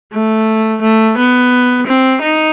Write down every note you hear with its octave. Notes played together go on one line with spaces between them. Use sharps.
A3
A3
B3
C4
D#4